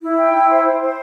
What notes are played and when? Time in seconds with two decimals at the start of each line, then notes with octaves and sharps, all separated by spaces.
0.01 E4
0.18 G5
0.34 E4
0.49 C5
0.65 C5
0.81 C5